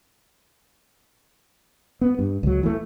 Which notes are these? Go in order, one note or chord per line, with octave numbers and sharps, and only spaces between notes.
B3
G2
C#2 F#3
E3 A3